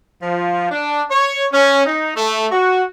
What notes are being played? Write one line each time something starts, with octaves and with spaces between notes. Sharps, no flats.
F3
D4
C#5
C#4
D#4
A3
F#4